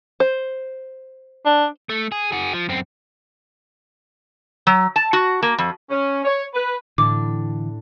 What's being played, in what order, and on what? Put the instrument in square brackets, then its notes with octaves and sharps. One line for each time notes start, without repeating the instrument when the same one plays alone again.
[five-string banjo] C5
[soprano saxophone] D4
[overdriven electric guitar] A3
G#4
F#4 G#4
F3
F#2 C4
[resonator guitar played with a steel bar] F#3
A5
F#4
A#3
F2
[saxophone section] C#4
C#5
B4
[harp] A2 D4 [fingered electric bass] D3 E3 [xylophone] D6